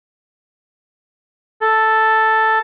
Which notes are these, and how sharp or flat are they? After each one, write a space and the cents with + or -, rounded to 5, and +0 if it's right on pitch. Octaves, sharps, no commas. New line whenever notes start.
A4 +0